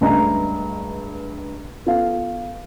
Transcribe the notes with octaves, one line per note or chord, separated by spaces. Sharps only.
C#2 G2 A3 D4 D#5 A#5
B3 F4 A4 F5